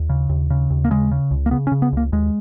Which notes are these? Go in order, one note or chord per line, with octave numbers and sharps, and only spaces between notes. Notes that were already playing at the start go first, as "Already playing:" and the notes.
Already playing: D#2
C#3
D#2
C#3
D#2
A#3
C#3 G#3
C#3
C#2
A#3
C#3 B3
C#4
C#3
B3
C#2 A#3
D#2 G#3